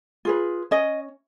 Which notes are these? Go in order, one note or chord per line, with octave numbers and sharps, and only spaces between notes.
F4 G#4 B4
C#4 D#5